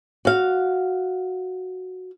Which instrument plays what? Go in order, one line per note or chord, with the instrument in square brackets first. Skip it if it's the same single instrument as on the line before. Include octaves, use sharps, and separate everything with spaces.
[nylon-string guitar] F#4 F5